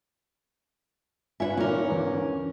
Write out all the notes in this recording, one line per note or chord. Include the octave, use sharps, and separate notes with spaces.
D4 F4 B4 C#5 E5 G#5
A#2 D#3 C#4 A#4
E2 G#2 D#3
D3